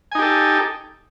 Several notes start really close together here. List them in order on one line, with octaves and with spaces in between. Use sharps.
G#5 D#4 G4 A4